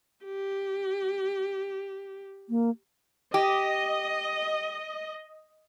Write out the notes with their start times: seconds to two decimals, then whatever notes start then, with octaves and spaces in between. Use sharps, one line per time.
0.25 G4
2.50 A#3
3.34 G4 D#5